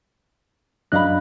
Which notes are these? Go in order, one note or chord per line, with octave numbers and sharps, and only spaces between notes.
F#2 D4 D#5 F5 B5 F#6